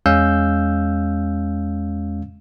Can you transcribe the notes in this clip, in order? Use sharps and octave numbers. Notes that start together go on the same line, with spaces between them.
E2 G#3 C#4 F5 E6 G6